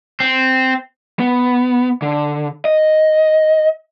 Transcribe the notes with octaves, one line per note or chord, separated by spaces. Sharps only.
C4
B3
D3
D#5